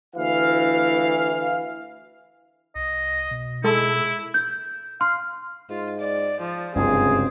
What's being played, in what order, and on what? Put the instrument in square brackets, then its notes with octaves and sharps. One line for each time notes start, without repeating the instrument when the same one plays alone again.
[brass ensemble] D2 E3 F5
[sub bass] C2 [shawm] D#5
[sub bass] B2
[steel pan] G#3 A4 [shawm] E4
[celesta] G6
[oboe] F5 [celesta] C6
[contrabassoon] G#2 [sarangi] F4
[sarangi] D5
F3
[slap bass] F#1 G2 C3 [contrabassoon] C#2 [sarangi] C4 [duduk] G#4